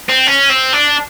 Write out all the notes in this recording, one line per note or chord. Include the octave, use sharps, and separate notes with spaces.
C4
C#4
C4
D4